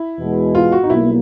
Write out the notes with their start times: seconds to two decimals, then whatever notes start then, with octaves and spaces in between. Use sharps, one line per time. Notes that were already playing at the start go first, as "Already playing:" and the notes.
Already playing: E4
0.19 E2 B2 G#3
0.55 F4
0.72 F#4
0.83 D#4
0.89 B1 B2 G3 A#3 E4